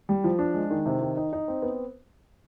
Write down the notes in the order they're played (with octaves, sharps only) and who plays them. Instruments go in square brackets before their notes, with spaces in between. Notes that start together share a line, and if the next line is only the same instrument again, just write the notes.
[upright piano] G3
F3
D4
G#3
D#3
C3
D#3
D#4
D#4
C4
B3